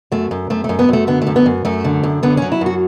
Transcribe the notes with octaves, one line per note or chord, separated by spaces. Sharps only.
F#2 A3
F#2
F#2 A3
A3
F#2
B3
F#2 A3
D3 B3
A3
F#2
B3
F#2
F#2 A3
D3
F#2
D3 B3
F#3 C#4
E4
F#2 F#4